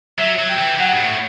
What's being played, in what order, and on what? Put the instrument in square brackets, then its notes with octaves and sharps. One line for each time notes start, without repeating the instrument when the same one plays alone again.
[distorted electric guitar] F#3 [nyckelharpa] E5
[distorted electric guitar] F#3
[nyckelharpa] G5
[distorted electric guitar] E3
[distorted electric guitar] F#3 [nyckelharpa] F#5
[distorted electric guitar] G2
A2